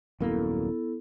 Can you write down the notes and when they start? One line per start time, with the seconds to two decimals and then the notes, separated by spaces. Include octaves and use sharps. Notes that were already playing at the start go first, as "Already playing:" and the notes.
0.20 D#1 F#2 A#3 B3 E4 A4